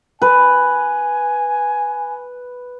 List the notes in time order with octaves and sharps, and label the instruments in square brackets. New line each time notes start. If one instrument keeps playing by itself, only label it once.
[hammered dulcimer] B4 [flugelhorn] G#5